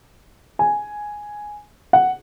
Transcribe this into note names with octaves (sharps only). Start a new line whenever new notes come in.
G#5
F#5